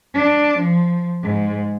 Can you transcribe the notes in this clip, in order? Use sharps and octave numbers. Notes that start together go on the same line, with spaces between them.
D4
F3
G#2